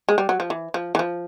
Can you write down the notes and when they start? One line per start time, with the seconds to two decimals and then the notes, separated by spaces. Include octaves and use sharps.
0.09 G#3
0.18 G3
0.29 F#3
0.40 F3
0.50 E3
0.74 F3
0.95 E3
0.99 F3